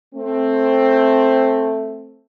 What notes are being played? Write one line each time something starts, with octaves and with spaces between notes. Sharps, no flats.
A3 C4